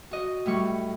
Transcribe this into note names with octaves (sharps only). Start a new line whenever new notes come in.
F#4 D#5
A2 G3 C#6